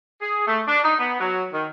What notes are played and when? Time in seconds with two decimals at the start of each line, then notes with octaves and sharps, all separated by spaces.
0.22 G#4
0.47 A3
0.67 D4
0.84 D#4
0.99 B3
1.20 F#3
1.53 D#3